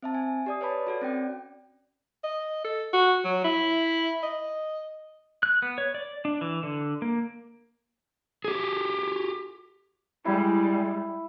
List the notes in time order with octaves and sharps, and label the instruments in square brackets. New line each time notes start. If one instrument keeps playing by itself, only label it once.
[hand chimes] C4 E5 A5
G#5
G4 D5 D#6
B4 C#5 D5 A5 B5
F#4 A4 D5
C4 C#4 G5
[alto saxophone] D#5
A4
F#4
F#3
E4
D#5
[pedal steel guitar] F#6
B3
C#5
D5
D4
E3
D3
A#3
[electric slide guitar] G4 G#4
[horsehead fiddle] G3 G#3 [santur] E4